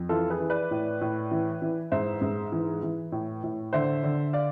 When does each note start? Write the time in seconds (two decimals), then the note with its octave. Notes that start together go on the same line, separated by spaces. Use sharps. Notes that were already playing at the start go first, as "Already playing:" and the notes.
Already playing: F2
0.09 E3 F4 A4
0.30 G#4 B4
0.40 E3
0.50 B4 D5
0.71 A2
1.01 A2
1.31 E3
1.62 E3
1.92 G#2 C5 E5
2.21 G#2
2.52 E3
2.82 E3
3.12 A2
3.44 A2
3.73 D3 C5 E5
4.04 D3
4.33 D5 F5